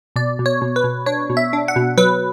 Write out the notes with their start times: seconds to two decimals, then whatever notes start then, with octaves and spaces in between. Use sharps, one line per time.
0.16 B2 D5
0.39 B2
0.46 C#5
0.61 B2
0.76 B4
0.84 B2
1.06 D4 C#5
1.29 B2
1.37 E5
1.53 D4
1.68 F#5
1.76 B2
1.98 F#3 B4